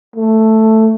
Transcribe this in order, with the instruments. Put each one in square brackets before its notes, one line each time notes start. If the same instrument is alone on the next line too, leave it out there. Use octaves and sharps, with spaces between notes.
[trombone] A3